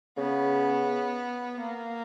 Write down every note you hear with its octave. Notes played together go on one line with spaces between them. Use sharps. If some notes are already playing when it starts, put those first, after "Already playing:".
C#3 B3
A#3